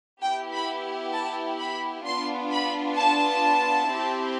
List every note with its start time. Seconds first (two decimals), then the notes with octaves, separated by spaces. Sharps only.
0.22 B3 E4 G4 G5
0.53 B5
1.13 A5
1.60 B5
2.06 B3 D4 F4 C6
2.51 B5
2.97 A5
3.88 C4 E4 G4